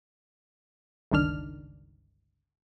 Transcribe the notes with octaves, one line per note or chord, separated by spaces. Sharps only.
G1 C#2 D#3 D4 F6